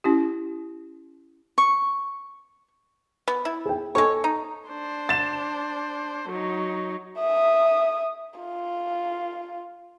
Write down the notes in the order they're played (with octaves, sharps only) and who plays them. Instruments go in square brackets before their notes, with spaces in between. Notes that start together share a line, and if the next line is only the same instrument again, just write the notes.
[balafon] C#4 E4 G4
[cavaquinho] C#6
[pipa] B3
E4
[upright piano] G#4 G5
[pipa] G#3 C#5 [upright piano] A4 C#6
[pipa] D#4
[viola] D4 C5
[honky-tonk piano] A6 E7
[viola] F#3 D#4
[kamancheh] E5 D#6
F4